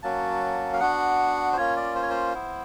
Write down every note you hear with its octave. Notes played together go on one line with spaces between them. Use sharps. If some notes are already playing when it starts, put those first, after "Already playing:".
F#3 A#3 C#4 F#4 A5
F5
B3 D4 F#4 F#5
C5
A#3 C#4 F4 C#5
D5
C5
C#5
C5
B3 E4